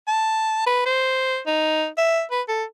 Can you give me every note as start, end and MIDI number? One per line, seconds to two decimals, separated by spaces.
0.07 0.65 81
0.66 0.84 71
0.86 1.39 72
1.47 1.87 63
1.97 2.22 76
2.31 2.42 71
2.48 2.64 69